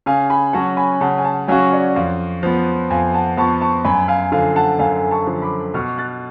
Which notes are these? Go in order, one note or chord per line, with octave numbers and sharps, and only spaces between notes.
C#3 F5 G#5
G#5 B5
F#3 C#4 F#4 F#5 A5
G#5 B5
C#3 F#5 A5
G#5
F#5 A5
F#3 C#4 F#4 F5 G#5
D5 F#5
F2 C#5 F5
F3 B3
F2 F5 G#5
F#5 A5
F3 B3 A5 C#6
A5 C#6
F#2 G#5 B5
F5 G#5
D3 F3 F5 G#5
F#5 A5
F#2 F5 G#5
A5 C#6
D3 F3
B5 D6
B2 C#6 F6
F#6 A6